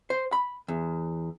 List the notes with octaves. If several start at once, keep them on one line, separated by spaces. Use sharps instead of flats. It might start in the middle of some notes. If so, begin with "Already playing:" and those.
C5
B5
E2